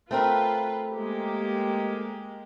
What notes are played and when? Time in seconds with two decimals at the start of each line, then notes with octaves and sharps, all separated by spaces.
0.11 A3 C4 F4 A#4 B4
0.92 G#3 A#3 G4